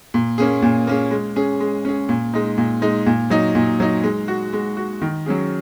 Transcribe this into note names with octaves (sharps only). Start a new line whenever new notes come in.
A#2
A#3 C#4 G#4
A#2
A#3 C#4 G#4
G#3
C#4 G#4
G#3
C#4 G#4
A#2
G#3 D#4
A#2
G#3 D#4
A#2
F#3 D#4
A#2
F#3 D#4
G#3
F#4
G#3
F#4
D#3
F#3 C#4 G#4